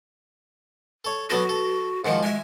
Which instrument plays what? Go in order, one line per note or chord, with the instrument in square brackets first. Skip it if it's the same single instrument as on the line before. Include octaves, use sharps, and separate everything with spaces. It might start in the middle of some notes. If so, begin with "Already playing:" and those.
[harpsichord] A4 C#5
[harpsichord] F#3 B3 A4 [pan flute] F#4
[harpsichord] A4
[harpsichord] G#2 D#3 F3 [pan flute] F#5
[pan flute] G#3 [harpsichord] E5 G#5